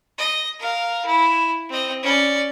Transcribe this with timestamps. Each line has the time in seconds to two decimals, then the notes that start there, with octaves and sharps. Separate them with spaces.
0.18 D#5
0.59 A#4 F5
1.06 E4
1.70 C4 D#5
2.03 C#4 D5